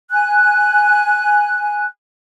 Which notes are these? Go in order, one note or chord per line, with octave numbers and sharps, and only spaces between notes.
G#5 F#6